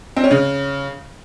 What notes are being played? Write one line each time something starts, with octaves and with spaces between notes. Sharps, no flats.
C4
C#4
C#3